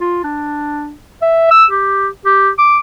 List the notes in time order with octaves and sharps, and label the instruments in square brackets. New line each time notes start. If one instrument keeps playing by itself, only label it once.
[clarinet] F4
D4
E5
E6
G4
G4
D6